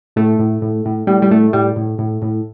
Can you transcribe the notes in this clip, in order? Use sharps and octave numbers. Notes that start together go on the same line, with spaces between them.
A2 A3
A2
A2
A2
A2 G3
G3
A2 A3
A2 G3
A2
A2
A2